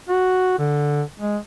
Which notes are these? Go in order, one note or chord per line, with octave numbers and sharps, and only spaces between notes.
F#4
D3
G#3